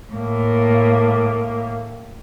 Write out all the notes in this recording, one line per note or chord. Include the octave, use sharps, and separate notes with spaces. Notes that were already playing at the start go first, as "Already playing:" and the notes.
A2 A#3